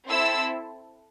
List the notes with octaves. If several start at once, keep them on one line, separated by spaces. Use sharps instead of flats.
C4 E4 A4 C6 E6